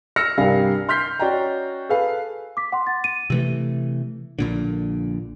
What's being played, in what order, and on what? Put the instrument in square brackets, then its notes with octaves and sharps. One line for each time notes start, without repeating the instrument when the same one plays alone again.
[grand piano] E6 F6 A#6 C#7
C2 G2 G3 A#4 F5 G#5
C6 F6 G6 B6 C7
C#4 F#4 D5 D#5 G5 A#5
G#4 A4 B4 F5
[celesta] D6 B6
F#5 C6
A6
D#7
[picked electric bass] C3 E3 A3
A#1 A#2 D3